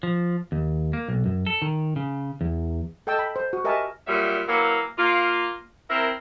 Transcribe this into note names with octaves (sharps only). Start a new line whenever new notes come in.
F3
D#2
A#3
B1
F#2
A4
D#3
C#3
E2
A4 D#5 G5 A5 E6
G5 B5
C5
F#4
G4 A#4 D#5 E5 G#5 A5
A#2 F#3 G3 E5
E3 F#3 A#3
A#3 F4
C4 E4 A#4